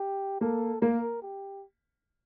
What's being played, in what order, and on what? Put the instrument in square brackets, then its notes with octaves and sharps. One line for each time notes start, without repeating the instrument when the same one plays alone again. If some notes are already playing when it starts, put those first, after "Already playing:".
Already playing: [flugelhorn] G4
[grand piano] A#3 [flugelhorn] A4
[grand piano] A#3 [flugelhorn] A#4
[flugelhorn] G4